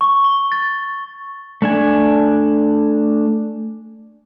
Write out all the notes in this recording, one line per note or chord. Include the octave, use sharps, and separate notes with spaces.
C#6
G7
A6
A3 D4 G#5